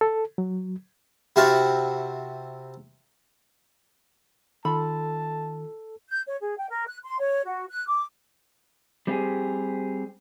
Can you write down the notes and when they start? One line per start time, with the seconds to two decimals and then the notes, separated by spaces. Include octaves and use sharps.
0.01 A4
0.38 F#3
1.36 C3 C4 E4 F#4 F5 A5
4.65 D#3 F4 A4 A5 B5
6.09 G6
6.27 C#5
6.41 G#4
6.58 G5
6.70 A#4
6.87 F#6
7.04 C6
7.20 C#5
7.45 F#4
7.69 F#6
7.87 D6
9.07 G3 C4 E4 F4 G4 G#4